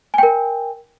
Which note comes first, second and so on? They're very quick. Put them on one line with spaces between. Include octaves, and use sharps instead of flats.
G#5 G5 A#4